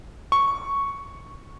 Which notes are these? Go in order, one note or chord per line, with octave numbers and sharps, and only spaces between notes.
C#6